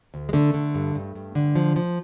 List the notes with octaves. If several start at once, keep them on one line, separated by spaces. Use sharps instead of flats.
D2
G#3
D3 A3
D3
G2
G2
G2
D3
F3
F3